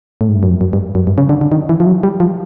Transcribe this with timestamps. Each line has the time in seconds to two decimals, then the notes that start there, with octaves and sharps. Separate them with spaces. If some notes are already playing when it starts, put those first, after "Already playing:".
0.21 A2
0.29 G#2
0.36 G2
0.43 F#2
0.50 F2
0.61 F#2
0.73 G2
0.95 F#2
1.07 G2
1.18 C#3
1.29 D3
1.41 D3
1.52 D#3
1.69 E3
1.80 F3
1.87 F#3
2.03 G3
2.20 F3